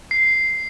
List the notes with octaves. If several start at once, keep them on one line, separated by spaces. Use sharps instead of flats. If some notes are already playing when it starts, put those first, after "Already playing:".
C7